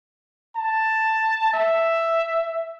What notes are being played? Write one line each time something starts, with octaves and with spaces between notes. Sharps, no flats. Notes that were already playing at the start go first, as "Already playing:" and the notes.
A5
E5